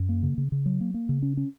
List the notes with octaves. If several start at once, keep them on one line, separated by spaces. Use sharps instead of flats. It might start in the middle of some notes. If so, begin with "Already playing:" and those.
Already playing: F#2
A#3
C#3
C#3
C#3
F#3
A#3
A#3
C#3
C#4
C#4